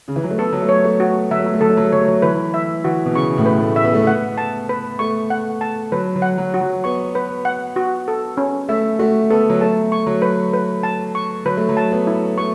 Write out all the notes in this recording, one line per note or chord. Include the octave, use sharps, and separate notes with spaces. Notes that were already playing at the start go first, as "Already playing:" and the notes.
C#3
E3
F#3
A3
B3 A4
F#3
A3
C#5
A3
F#4
F#3 E5
A3
F#3
A3
F#3 A4
A3
F#3
A3
F#3 C#5
A3
F#3
E3 B4
E5
E3 F#4
B2
C#3 C#6
A2
B4
A3
E5
B3
A3
B3 F#5
A5
B4
A3 C#6
F#5
A5
F#3 B4
F#3
F#5
F#3
F#4
F#3
B3 C#6
B4
F#5
F#4
A4
C#4
A3 E5
A3 F#4
B3 A4
F#3
A3 A5
C#6
F#3
B4
B4
A5
C#6
F#3 B4
A3
F#3
A5
B3
E4
A3 C#6